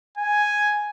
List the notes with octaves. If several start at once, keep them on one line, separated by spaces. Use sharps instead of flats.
G#5